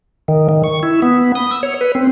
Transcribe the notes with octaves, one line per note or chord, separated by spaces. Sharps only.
D#3
D#3
C#6
E4
B3
D#6
E6
C#5
B4
C4